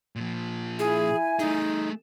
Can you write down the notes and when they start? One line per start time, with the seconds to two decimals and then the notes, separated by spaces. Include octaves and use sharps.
0.16 A#2 F3
0.79 E4 G#4 G#5
1.39 A3 D#4 G#4